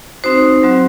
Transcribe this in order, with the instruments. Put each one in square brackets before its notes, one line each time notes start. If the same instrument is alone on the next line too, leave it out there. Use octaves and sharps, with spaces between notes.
[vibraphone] C4 D#4 F#4 C5
F#3 C4 F#4